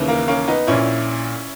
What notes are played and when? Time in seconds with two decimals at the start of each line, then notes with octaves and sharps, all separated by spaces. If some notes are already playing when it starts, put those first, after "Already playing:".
Already playing: D#2 C#3 E3
0.08 A#3
0.28 A#3 C#4
0.48 B3 D#4
0.67 A#1 A#2 C#4 E4